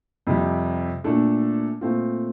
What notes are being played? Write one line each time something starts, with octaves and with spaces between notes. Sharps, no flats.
F2 C3 G3
A#2 A3 D4 A4
A#2 A3 C4 F4